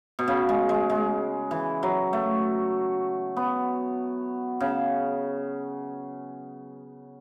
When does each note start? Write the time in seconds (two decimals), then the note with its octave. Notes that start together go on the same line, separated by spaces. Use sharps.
0.19 B2
0.28 C#3
0.49 G#3
0.69 G#3
0.90 G#3
1.51 E3
1.83 F#3
2.13 A3
3.36 B3
4.60 C#3